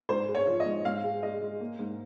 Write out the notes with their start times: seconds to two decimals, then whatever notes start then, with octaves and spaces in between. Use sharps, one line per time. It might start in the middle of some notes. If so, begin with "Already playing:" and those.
0.09 G#2 C5
0.29 G#3
0.35 C#5
0.47 F3
0.60 D#5
0.66 G#2
0.85 G#2 F5
1.04 G#3
1.23 G#3 D#5
1.41 G#3
1.61 A#3
1.79 G#2